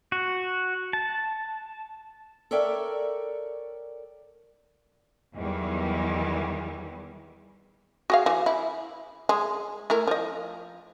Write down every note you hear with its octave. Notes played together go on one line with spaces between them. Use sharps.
F#4
A5
A4 A#4 C#5 D5 E5 G5
E2 D#3 F#3 G3
F#4 G#4 F5
E3
E4
G#3
A3 E4 A#4
F3 D#5